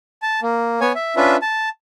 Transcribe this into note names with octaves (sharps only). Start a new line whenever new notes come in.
A5
A#3
B3 C#5 G#5
E5
C#4 D4 F4 B4 E5
A5